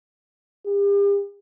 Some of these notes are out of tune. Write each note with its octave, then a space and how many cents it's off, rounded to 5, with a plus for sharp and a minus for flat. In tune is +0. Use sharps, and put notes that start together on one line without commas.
G4 +40